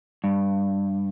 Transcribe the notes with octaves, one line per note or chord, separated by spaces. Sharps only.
G2